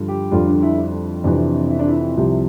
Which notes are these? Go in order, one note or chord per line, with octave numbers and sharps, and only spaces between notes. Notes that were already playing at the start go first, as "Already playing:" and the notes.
Already playing: G2 D3 F3
G4
F2 D3 G3 F4
D4
E4
D4
F2 C3 E3 D4
E4
D4
E4
C2 C3 F3